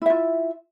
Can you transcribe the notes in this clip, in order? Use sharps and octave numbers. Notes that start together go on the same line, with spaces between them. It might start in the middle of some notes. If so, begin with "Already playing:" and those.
E4 F4 E5